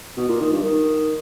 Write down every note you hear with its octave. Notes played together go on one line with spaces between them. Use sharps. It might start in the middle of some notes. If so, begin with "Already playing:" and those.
B2
A#2
D#3
G2
D#3